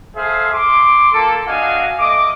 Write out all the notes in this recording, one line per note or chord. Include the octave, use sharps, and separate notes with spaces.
G#4 A4 C5 E5 F5
C6 D6
A#3 F4 A4
D4 F#4 D#5 F5 G#5
A3 D#5 D6